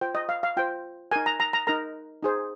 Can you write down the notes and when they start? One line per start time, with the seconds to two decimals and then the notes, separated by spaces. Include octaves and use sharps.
0.01 F4 C5 G5
0.15 D#5
0.29 F5
0.43 F5
0.57 F4 C5 G5
1.11 D#4 A#4 G#5
1.26 A#5
1.40 A#5
1.53 A#5
1.67 D#4 A#4 A#5
2.23 D#4 G#4 C5